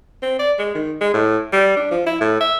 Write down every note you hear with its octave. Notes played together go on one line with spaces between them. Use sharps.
C4
D5
G#3
D#3
G#3
A2
G3
D4
F3
E4
A2
E5